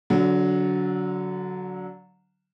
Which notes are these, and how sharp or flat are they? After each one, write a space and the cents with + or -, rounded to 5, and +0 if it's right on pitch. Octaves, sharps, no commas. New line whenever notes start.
D3 -25 F#3 +0